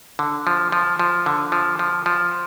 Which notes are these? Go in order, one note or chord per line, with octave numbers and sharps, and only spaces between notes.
D3
F3
F3
F3
D3
F3
F3
F3